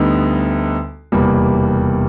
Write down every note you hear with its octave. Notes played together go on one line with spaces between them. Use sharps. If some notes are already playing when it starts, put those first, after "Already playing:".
Already playing: D2 D3 G3 B3 D#4
F1 E2 B2 G3 A#3